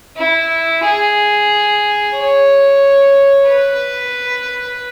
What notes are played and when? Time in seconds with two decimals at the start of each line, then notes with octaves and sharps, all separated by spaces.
0.17 E4
0.84 G#4
2.16 C#5
3.48 B4